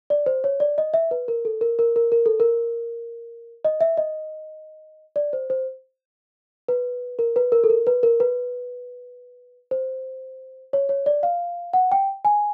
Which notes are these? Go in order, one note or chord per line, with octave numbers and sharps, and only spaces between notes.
D5
C5
C#5
D5
D#5
E5
B4
A#4
A4
A#4
A#4
A#4
A#4
A4
A#4
D#5
E5
D#5
D5
C5
C5
B4
A#4
B4
A#4
A4
A#4
B4
A#4
B4
C5
C#5
C#5
D5
F5
F#5
G5
G#5